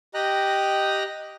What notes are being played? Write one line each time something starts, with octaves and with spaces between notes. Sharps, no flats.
G4 D#5 G5 A#5 F#6